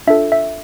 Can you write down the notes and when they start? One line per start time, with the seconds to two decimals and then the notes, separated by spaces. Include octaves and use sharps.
0.07 D4 F4 A4 E5
0.32 E5